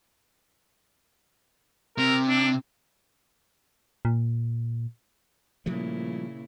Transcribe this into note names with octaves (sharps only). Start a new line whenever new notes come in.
C3 A#4
D4
A#2
A#2 C#3 F3 G3 A3 E4